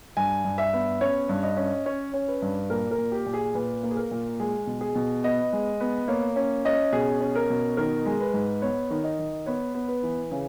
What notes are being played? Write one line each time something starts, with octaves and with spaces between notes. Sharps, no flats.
G2 G#5
G2
E5
B3
C#4 C#5
G2
D#5
C#4
C#4 C#5
C#4
B4
G2
A#2 A#4
A#4
A#2
G4
A#2
G#4
A#2 B4
A#3
G#4
A#4
A#2
G#3 G#4
B2
G#4
B2
B3 D#5
G#3
B3
A#3 C#5
C#4
C#4 D#5
B2 G#4
C#4
A#4
B2
D#3 A#4
G#3
B4
G#2
B3 C#5
D#3
D#5
D#3
B3 C#5
B3
B4
E3
C#3